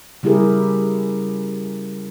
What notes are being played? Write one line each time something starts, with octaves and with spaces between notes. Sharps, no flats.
C#3 G3 E4 G4 G#4 A#4